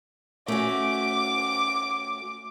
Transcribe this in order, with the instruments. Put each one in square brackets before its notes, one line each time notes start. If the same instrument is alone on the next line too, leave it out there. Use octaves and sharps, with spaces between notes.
[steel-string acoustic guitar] A3 C#4 F#4 [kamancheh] D6